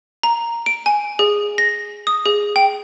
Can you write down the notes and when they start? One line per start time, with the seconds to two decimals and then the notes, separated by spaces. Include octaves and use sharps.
0.23 A#5
0.66 D7
0.86 G#5
1.19 G#4
1.58 A#6
2.07 D#6
2.26 G#4
2.56 G5